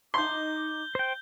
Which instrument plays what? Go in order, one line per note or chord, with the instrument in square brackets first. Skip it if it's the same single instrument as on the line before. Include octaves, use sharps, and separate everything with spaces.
[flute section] D#4 D6 [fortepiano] C6 [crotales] G6 G7
[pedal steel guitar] C5 G5